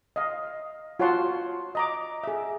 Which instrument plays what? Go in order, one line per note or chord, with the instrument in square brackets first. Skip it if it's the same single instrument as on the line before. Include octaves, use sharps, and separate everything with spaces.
[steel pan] D#5 F5
F4 F#4 C#5 F#5 A5 C6
D#5 A#5 D6
G#4 E5